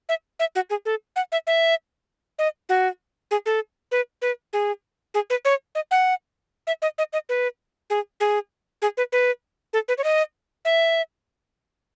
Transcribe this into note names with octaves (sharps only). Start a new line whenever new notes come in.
E5
E5
F#4
G#4
A4
F#5
E5
E5
D#5
F#4
G#4
A4
B4
B4
G#4
G#4
B4
C#5
D#5
F#5
E5
D#5
D#5
D#5
B4
G#4
G#4
G#4
B4
B4
A4
B4
C#5
D#5
E5